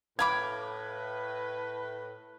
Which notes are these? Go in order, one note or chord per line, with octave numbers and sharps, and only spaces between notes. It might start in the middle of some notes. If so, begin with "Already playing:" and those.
A2 B4 F5 B5 D6 G#6